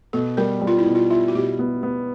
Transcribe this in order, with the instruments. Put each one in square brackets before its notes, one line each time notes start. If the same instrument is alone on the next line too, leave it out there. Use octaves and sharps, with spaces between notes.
[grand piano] B2 [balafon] A4
[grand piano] G3 [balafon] A#4
[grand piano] G3
[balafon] F4
E4
[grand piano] B2
[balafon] F4
[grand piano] E4 [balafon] F4
[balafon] F#4
[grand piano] B2 [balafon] G4
[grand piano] B3
B3